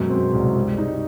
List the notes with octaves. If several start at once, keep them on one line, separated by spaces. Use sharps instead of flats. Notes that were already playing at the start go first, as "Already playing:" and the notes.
Already playing: F#2 B2 G#3
C4
C2
G3
D#4